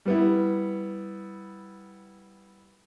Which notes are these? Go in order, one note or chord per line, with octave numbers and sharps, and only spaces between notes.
G3 B3 E4